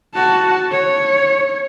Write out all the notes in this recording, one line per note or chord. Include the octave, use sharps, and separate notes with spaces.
F#4 A5
C#5